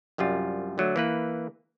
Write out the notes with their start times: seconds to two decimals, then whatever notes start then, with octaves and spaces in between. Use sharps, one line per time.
0.18 C2 F#2 G3 F4
0.78 D3 F#3 A3
0.96 E3 A#3 B4